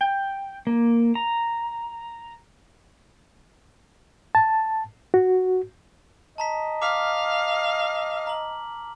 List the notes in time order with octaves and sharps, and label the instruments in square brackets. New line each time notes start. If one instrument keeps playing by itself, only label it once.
[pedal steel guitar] G5
A#3
A#5
[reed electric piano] A5
F#4
[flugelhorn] D#5 [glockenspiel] A5 A#5 B6
[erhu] F5 [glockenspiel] D6 F6 B6
[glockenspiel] A#5 F#7